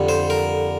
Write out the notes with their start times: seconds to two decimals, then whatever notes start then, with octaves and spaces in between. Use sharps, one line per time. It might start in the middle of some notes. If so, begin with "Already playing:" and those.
Already playing: F2 D3 G3
0.09 C5
0.30 A#4